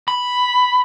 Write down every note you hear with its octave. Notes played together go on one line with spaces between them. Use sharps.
B5